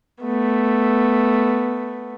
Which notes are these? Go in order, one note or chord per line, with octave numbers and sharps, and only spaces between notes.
A3 B3